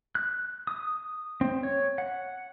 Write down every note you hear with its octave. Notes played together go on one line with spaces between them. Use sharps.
F#6
D#6
C4
C#5
F#5